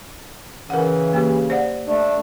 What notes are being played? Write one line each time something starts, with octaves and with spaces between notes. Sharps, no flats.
C#3 E3 A#4 F#5
A#3 G4
C5 D5 F#5
A3 D4